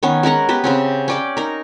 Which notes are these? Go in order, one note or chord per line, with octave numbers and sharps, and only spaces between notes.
D#3 B3 C#4
G#3 C#4 A#4 F#5
B3 G4 B4
C#3 C4 C#4
C#4 D5 G5
D#4 A#4